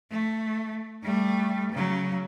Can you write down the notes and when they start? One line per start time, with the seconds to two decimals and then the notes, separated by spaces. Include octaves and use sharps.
0.10 A3
1.03 G3 A3
1.72 C#3 F#3